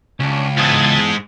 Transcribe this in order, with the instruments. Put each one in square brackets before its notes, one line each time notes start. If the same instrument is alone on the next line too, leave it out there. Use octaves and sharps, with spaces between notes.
[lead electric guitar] C#2 [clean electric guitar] C#4 D4
[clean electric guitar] E2 A4 [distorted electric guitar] G#2 G#3 [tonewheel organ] D#6 G#6 A6